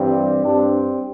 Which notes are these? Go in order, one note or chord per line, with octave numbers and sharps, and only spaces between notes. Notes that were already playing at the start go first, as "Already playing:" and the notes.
Already playing: G2 E3 G3 C4
G2 G3 C4 D4